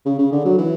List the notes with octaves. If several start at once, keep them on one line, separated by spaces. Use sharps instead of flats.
C#3
C#3
D3
F#3
E3